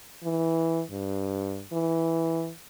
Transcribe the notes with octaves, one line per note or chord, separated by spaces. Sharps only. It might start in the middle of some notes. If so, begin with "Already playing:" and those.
E3
G2
E3